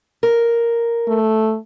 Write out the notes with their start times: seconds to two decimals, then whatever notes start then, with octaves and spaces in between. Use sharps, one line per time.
0.23 A#4
1.08 A3